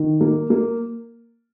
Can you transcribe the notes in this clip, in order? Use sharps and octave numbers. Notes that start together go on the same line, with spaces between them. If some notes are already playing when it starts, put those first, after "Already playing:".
Already playing: D#3
A#3
A#3